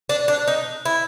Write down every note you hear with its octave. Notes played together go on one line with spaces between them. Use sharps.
D4
D4
D#4
E4